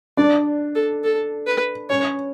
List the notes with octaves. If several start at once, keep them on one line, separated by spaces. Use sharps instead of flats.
D4 D5
A4
A4
B4
C#4 C#5